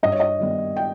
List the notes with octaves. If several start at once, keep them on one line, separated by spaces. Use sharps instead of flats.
G2 D#5
C#5
D#5
D#3 G3 B3
G5